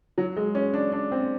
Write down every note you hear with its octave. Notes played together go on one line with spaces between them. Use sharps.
F#3
G#3
C#4
D4
D4
C4